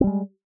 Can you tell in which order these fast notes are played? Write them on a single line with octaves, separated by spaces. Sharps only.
C4 G3 G#3